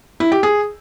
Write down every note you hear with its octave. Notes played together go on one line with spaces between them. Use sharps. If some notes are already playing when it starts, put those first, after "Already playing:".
E4
G4
G#4